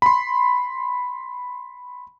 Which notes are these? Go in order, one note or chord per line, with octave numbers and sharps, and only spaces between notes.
B5 C6